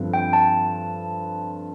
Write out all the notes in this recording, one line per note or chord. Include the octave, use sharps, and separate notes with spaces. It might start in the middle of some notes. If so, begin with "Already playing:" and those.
Already playing: G2 D3 F3 C4 F4
G5
A5